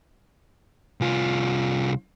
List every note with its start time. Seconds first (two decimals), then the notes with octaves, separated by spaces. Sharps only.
1.01 C2 F4